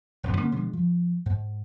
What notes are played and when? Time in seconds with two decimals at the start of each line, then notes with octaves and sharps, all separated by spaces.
0.23 D#1 F#2 B2
0.37 D3 A#3 B3 C#4
0.51 B2 D3 F3 G#3
0.73 F3
1.26 G#2